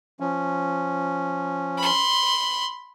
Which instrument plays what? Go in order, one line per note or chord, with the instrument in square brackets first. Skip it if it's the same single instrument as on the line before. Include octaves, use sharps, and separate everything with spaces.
[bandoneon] F3 C#4
[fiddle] B5 C6